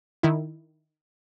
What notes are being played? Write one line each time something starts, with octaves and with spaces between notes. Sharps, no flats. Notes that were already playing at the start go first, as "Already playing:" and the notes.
D#3 E4